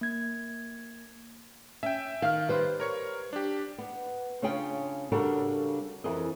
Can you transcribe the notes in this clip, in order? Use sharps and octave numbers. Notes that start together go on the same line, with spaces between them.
A#3 G#6
C#4 E5 G5
D#3 F5 F6
G3 B4 C5
A#4 C#5 C#6
D4 G4
B3
C#3 C#4 D4 F4 G#4 G5
C#3 G3 D4 F#4 A4 A#4
F2 E3 G#4 A#4 D#5